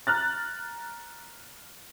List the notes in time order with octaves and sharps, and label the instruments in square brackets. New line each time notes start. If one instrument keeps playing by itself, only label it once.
[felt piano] A#5 F6 F#6 A6